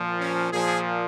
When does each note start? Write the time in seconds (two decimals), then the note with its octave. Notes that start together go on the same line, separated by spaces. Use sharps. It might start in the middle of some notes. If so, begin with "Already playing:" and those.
Already playing: A#2 F3
0.20 C#4
0.52 A#2 F3 G#4